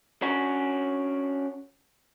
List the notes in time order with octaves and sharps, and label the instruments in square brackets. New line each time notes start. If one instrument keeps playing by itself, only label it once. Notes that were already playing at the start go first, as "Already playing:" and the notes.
[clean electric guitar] C#4 D4 F#4